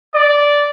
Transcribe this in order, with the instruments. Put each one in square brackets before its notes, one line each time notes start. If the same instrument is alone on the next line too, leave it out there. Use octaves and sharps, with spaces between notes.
[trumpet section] D5